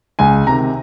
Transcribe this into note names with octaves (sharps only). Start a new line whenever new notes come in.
C#2 G#5
C3 D#3 A#5